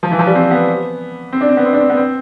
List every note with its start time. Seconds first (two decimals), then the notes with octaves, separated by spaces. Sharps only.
0.03 F3
0.11 E3
0.19 F3
0.27 G3
0.35 C4
0.51 B3
1.32 C4
1.41 D4
1.49 C4
1.57 B3
1.65 C4
1.73 D4
1.81 C4
1.90 B3
1.97 C4